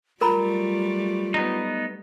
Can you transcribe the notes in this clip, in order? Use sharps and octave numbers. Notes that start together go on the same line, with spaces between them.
F#3 G3 A3 F4 A#4 A#5 B5
B3 D#4